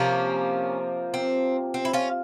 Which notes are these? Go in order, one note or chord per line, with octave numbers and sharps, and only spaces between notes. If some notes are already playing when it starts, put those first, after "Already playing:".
Already playing: C3 F3 A#3 C#4
C4
C4
E4
C#4 F4